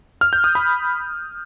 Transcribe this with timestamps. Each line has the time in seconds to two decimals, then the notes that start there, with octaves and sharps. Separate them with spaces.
0.21 F6
0.33 G6
0.44 D#6
0.55 B5